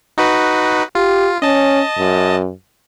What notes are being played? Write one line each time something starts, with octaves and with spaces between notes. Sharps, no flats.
D#4 F#4 B4
F4 G4
C#4 D#5 A5
F#2